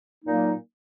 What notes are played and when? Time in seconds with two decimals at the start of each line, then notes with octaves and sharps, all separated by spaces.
0.23 A#2 F#3 A#3 D#4